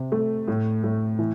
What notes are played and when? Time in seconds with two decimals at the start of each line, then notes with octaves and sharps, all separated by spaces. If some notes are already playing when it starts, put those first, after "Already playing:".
Already playing: C3
0.12 A3
0.48 A2
0.83 A2
1.19 E3